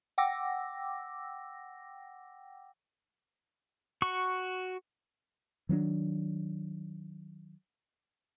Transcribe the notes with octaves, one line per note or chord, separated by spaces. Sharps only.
F#5 G5 D6 E6 A#6
F#4 C#6
D#3 F#3 C#4 D4